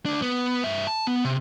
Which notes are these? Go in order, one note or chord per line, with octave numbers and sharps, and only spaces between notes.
D2 D4
B3
G2 E5
A5
B3
C3